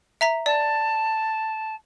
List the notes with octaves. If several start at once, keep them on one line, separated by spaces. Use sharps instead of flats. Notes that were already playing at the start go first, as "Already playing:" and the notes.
E5 A#5 B6
D5 A5